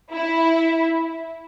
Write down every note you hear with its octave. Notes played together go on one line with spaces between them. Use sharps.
E4